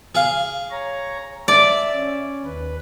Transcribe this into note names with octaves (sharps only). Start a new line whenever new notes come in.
G#4 F5
C#5 A#5
D5 E5
C#4
D#2 B4